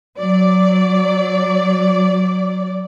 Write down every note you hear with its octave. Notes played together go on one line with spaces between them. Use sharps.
F#3 D5